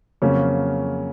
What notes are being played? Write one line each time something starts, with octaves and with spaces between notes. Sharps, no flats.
F2 C#3 F#3 A#3 C#4